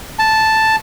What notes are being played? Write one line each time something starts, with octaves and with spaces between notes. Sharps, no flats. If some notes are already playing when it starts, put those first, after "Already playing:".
A5